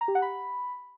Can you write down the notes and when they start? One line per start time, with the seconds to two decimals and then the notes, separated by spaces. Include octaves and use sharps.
0.01 A#5
0.08 G4
0.15 F#5
0.22 B5